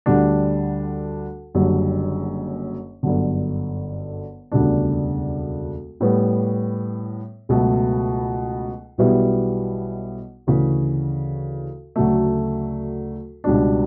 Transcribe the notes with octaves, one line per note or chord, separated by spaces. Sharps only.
D2 D3 G3 D4
F#1 F#2 D3 G3 D4
G1 F#2 D3
E1 D2 C#3 G3 D4
A2 G3 B3
C#2 B2 F#3 A3
B1 B2 G3 B3 E4
D2 C#3 E3
D2 C#3 F#3 A3
C#2 B2 G3 D4